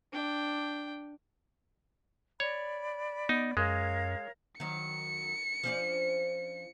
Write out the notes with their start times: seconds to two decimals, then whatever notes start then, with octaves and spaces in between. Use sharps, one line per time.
0.12 D4 G5
2.40 C#5 D5 B5
3.29 B3 D#4
3.57 F#2 G#3 A#4 C#5 F5
4.60 D#3 F#3 C#7
5.63 F3 C#4 D4